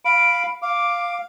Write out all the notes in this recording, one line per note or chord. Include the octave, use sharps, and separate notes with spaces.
F5 B5 D7
F5 D6